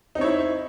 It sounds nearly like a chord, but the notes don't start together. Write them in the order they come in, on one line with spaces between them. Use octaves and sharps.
D#4 C4 C#5 E4